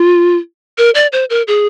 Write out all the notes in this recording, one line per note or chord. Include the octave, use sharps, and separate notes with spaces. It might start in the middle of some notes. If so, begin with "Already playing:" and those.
Already playing: F4
A#4
D5
C5
A#4
G#4